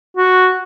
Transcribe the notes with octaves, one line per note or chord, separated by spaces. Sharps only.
F#4